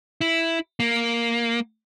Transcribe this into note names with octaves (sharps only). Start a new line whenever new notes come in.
E4
A#3